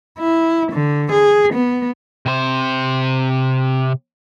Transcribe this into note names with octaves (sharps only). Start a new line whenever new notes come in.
E4
D3
G#4
B3
C3 C5